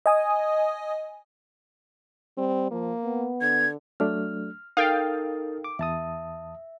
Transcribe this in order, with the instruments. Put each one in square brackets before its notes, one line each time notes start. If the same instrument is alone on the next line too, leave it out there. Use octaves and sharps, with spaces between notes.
[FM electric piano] D#5 G#5 D#6
[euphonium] G3 [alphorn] C4
[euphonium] F3 [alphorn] A#3
[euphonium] B3
[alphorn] D3 [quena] G#6
[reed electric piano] F#3 A3 D4 [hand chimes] F6
[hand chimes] D#4 A4 A#4 [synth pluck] F5 G5 [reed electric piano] D#6 A6
[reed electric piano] D6
[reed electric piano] E2 A5 D#6 [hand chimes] E5